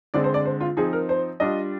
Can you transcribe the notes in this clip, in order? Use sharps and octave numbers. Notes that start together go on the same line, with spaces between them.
D3 G#3 C4 D5
C5
D5
C5
F4
F3 C4 D#4 G#4
A#4
C5
G3 D4 F4 D#5